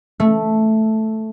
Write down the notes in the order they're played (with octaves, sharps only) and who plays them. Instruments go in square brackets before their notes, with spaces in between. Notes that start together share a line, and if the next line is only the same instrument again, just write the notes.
[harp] A3